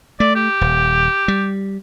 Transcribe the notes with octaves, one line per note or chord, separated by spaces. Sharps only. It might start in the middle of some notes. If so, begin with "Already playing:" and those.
A3 D5
G4
D#1
G3